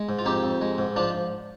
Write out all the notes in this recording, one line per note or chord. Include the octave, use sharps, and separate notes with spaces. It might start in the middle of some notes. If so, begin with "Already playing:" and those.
Already playing: G#3
G#2
F4
F2 D#4 G4
F2
G#3
G#2
F3 D4 F4